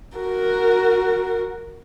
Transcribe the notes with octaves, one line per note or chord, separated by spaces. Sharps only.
F#4 A#4